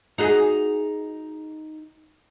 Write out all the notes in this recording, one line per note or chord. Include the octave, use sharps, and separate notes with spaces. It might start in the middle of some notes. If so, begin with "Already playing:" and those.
D#4 F#4 G#4